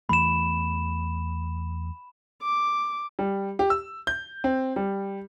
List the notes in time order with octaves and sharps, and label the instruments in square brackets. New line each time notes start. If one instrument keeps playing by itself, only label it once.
[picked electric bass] E2 E3 A3 [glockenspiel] B5 E7
[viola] D6
[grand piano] G3
G4
E6
G6
C4
G3